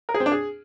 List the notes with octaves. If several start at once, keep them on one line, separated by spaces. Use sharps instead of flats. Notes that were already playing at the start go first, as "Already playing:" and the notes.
A#4
G#4
C4
D4
G#4